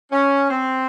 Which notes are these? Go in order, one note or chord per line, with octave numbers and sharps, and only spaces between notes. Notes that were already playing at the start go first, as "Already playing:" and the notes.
C#4
C4